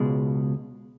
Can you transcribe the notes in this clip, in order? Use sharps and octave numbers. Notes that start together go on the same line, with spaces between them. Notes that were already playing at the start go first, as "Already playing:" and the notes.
Already playing: C#2 B2 G#3